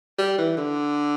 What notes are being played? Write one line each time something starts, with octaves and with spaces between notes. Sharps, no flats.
G3
E3
D3